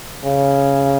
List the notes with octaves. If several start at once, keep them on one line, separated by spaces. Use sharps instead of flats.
C#3